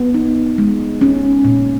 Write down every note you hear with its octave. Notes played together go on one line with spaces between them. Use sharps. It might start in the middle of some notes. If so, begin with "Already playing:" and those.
Already playing: B3
D#4
G#3
C#4
A#2